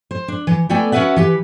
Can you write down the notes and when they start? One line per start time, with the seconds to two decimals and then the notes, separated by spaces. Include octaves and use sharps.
0.11 C5
0.28 D4
0.47 E3
0.69 A3 B3 A4 D5 G5 G#5
0.92 C#4 F#4 A#4 B4 E5 F#5
1.16 E3 G4 B4